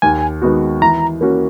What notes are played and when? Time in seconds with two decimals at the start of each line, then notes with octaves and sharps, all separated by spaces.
0.02 D#2 G#5
0.42 D#3 G#3 B3 F#4
0.82 E3 A#5
1.21 A#3 C#4 F#4